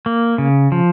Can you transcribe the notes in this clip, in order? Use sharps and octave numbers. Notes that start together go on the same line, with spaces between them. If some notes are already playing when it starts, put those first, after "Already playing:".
A#3
C#3
F3